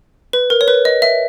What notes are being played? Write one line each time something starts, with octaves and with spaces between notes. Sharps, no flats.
B4
A#4
C#5
B4
D#5
E5